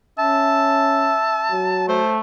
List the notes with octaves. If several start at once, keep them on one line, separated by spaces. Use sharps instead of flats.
C#4 E5 A5
F#3
A3 C5